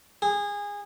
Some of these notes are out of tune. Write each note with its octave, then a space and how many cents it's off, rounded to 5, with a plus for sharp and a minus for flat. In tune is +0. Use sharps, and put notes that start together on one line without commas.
G#4 -25